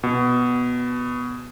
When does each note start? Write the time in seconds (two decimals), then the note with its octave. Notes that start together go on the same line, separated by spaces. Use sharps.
0.03 B2